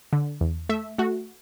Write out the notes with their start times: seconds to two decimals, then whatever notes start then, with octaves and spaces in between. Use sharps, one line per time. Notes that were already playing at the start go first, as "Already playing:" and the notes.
0.13 D3
0.41 E2
0.69 A3 E5
0.98 A3 F#4